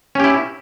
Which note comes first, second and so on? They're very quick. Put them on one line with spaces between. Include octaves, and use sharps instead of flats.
C#4 G4 E4